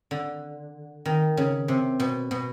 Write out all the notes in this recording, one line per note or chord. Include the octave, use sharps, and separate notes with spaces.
D3
D#3
C#3
C3
B2
B2